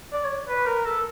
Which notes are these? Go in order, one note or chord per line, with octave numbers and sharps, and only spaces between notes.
D5
C#5
B4
A#4
A4